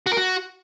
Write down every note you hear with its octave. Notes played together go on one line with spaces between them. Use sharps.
F#4
A#4
F#4